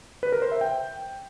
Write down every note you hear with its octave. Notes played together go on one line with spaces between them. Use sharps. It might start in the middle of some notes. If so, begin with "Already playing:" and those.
B4
A#4
C5
E5
G5